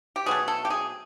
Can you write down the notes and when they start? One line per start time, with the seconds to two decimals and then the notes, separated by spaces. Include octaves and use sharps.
0.16 G4
0.26 B2 F#3 A3 G#4
0.48 A4
0.65 G4
0.70 G#4